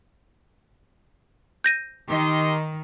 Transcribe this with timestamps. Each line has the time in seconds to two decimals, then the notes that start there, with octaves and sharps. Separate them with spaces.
1.64 G6 A#6 D#7
2.09 D#3 G4 D#5 C6